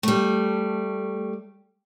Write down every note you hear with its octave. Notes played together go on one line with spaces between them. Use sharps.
G3 A3